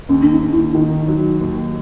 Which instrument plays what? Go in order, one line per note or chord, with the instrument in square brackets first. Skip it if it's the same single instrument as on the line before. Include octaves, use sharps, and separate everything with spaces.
[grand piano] D#2 [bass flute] C#4
[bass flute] D4
D#4
[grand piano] D#2
[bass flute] E4
D4
[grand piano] D#3 [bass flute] D#4
[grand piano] F#3
D#2